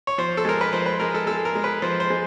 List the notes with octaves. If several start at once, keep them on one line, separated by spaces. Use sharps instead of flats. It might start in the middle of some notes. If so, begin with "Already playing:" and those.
C#5
F3 C5
A4
G#3 A#4
B4
F3 C5
B4
G#3 A#4
A4
G#3 A4
A#4
G#3
B4
F3 C5
C5
G#3